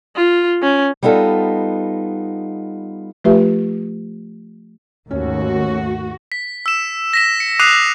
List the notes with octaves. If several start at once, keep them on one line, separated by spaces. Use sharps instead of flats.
F4
C#4
G3 B3 D#4 F4 A4
F3 A3 F4 G4 B4 E5
D#2 G#2 D#3 A3 C#4 F#4
B6
E6 E7
A#6 B6 E7
C#7
D6 D#6 F#6 C7 D#7 F7